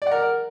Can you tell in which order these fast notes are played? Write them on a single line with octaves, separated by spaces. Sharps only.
D5 F#5 A#4